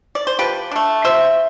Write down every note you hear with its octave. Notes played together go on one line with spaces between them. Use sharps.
D5
C5
F3 G4 B4
A3 D4
F3 C5 E5